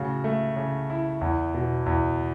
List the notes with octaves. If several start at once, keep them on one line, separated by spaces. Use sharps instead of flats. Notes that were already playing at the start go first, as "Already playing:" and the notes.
Already playing: A2 C#3 F#4
A3
C#3
E4
E2
B2
E2